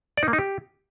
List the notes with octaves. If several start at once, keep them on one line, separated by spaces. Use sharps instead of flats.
D5
D#4
A#3
D#4
G4